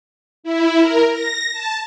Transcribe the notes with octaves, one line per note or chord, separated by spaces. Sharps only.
E4
A#4
A#6
A5